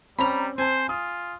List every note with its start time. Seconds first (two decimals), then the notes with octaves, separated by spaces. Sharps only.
0.18 G3 C4 C#4 A#5 B5
0.58 C4 C5 G#5 A5
0.89 F4 D#6